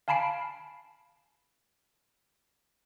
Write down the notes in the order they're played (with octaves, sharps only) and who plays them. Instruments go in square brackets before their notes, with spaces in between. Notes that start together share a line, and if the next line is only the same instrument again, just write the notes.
[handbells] F5 G#5 A5 B5 C7 D7